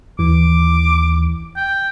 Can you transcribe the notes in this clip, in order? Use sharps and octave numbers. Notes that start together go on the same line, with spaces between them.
D#2 E3 D6
G5